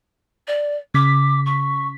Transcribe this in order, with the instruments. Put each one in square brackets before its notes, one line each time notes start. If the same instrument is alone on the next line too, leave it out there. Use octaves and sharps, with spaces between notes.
[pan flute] D5
[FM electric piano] C#3 B6 [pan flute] D6
[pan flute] C#6